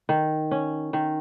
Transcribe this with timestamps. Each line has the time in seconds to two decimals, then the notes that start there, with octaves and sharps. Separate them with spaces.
0.09 D#3
0.51 C#4
0.93 D#3